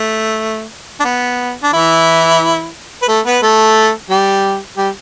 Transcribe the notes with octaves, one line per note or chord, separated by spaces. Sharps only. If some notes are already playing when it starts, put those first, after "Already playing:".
Already playing: A3
D4
B3
D4
E3 E4
B4
A3 A4
B3 B4
A3 A4
G3 G4
G3 G4